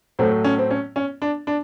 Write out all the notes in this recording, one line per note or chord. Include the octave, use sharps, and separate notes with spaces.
A2 F#3 A3 C4
C#4
C4
C#4
C#4
D4
D4